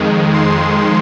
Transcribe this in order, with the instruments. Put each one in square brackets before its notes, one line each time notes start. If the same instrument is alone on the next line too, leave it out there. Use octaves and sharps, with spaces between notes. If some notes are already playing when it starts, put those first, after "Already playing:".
Already playing: [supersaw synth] F2 D#3 G#3
C6